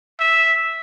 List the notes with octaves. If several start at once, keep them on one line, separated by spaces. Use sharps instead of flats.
E5